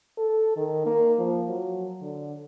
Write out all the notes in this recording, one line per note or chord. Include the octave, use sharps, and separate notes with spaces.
A4
D#3
A#3
F3
F#3
D3